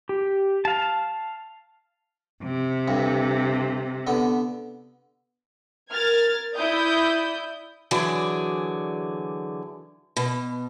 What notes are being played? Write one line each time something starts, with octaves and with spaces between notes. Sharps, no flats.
G4
F5 A5
C3
D2 G2
D3 B3
A#4 F6 G#6 A6
E4 D5 D#6 G6
D3 E3 F#3 G#4 D5
B2